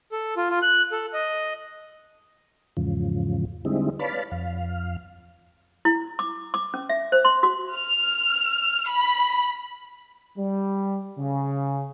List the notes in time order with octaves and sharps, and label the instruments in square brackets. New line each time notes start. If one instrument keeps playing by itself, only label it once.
[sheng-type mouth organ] A4
F4
F4
F#6
A4
D#5
[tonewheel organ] E2 G#2 C#3 F3
D3 G3 G#3 C4 D#4 E4
B4 C#5 D5 F5 A5 B5
F2 F5
[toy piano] E4
D6
D6
C#4
E5
C5
C6
F#4
[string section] F6
B5
[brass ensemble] G3
C#3